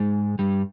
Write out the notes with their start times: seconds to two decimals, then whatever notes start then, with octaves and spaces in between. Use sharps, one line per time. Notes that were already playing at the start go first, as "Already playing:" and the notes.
Already playing: G#2 G#3
0.39 G2 G3